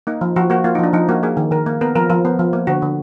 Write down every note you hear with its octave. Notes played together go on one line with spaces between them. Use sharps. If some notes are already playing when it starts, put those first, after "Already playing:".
A#3 D#4
F3
F3 F#4
A#3 F#4
A#3 F4
D#4
F3 D4
F3 D#4
A#3 F#4
A#3 G#4
D#3
D#3 A#4
A#3
B3 A#4
F3 A#4
F3 A#4
B3
F3
A#3
D3 F#4
D3